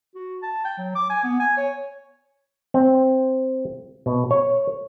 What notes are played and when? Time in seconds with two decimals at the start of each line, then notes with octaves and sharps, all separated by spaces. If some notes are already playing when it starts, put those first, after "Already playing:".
0.15 F#4
0.43 A5
0.65 G5
0.78 F#3
0.95 D6
1.10 G#5
1.24 B3
1.40 G#5
1.57 C#5
2.74 C4
4.06 B2
4.31 C#5